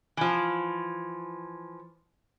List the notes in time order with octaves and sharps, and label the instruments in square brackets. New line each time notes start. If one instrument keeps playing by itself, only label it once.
[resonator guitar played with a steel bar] E3 F3